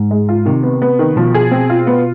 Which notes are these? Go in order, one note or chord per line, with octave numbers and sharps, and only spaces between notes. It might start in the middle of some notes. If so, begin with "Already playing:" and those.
Already playing: G#2
G#3
F4
C3 D#3
B3
B3
D#3
B2 F3
G#4
C4
F4
B3